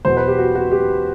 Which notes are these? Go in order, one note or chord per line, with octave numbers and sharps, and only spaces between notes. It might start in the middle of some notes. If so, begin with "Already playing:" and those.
E2 B2 F#3 B3 C5
B4
G4
F#4
F#4
G4